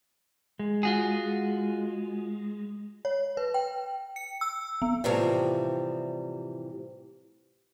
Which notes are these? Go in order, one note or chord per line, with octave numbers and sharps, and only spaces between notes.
G#3
F4 F#4 G#4
C#5
B4
G5
C#7
E6
B3
A2 C3 E3 F3 G3